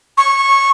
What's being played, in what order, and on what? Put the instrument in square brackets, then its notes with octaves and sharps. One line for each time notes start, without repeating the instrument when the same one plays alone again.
[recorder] C#6